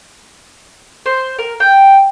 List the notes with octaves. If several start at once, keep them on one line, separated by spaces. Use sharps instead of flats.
C5
A#4
G5